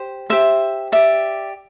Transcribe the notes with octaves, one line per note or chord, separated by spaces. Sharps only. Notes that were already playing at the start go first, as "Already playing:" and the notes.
Already playing: G4 C5
G4 C5 E5
G4 D5 E5